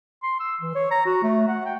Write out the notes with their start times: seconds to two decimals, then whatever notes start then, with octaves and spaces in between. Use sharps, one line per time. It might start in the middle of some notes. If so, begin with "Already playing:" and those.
0.23 C6
0.40 E6
0.61 E3
0.75 C#5
0.91 A#5
1.06 F#4
1.23 A3
1.48 F#5
1.65 G5